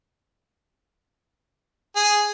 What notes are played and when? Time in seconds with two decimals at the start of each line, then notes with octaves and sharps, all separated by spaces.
1.96 G#4